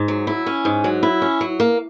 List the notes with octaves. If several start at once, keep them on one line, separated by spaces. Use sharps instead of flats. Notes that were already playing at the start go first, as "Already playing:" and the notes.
Already playing: G#2
F#3
E4
C#4
G#2
F#3
E4
C#4
F#3
A#3